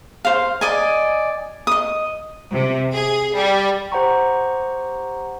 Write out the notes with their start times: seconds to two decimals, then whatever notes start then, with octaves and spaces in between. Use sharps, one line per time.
0.25 C5 F5
0.61 D5 D#5 G#5
1.67 D#5 D#6
2.51 C3
2.93 G#4
3.33 G3
3.92 G4 C5 F#5 A#5 C#6